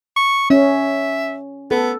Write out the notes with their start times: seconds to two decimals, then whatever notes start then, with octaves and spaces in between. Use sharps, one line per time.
0.16 C#6
0.50 C#4 E5
1.71 B3 A4